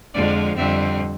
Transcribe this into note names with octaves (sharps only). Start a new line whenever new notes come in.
F2 D3 F3 G#3 D5
F2 D3 G3 C4 E5